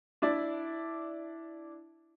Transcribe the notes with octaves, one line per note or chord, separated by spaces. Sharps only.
D4 E4 D5